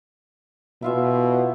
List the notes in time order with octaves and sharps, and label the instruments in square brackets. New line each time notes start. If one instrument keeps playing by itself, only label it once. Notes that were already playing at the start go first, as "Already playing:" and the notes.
[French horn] B2 [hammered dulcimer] E4 F4 E5